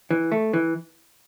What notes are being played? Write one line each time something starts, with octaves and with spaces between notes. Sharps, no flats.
E3
A3
E3